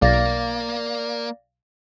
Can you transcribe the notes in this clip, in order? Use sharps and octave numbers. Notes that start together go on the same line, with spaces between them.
B1 A#3 D5 F5 A6 A#6